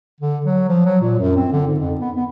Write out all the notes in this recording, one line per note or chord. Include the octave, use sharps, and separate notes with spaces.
D3
F#3
F3
F#3
A#2
F#2
C4
D3
G#2
F2
B3
B3